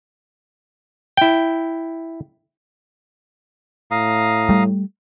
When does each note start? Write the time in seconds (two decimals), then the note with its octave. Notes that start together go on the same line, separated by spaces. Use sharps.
1.17 E4 G5
3.91 A2 F5 A#5 D#6
4.49 G3 A3